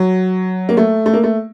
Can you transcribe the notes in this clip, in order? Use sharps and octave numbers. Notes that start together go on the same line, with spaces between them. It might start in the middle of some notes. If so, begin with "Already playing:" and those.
Already playing: F#3
A#3
A3
A3
A#3
A3